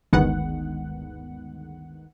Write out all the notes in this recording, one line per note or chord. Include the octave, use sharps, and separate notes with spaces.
G1 D2 D#3 G#3 B3 F#5